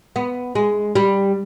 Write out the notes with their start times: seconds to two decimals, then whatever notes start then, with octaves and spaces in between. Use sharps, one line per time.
0.16 B3
0.55 G#3
0.95 G3